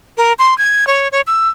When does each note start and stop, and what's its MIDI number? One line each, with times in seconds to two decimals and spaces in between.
0.18 0.33 70
0.39 0.57 84
0.58 0.87 92
0.87 1.08 73
1.12 1.21 73
1.27 1.49 88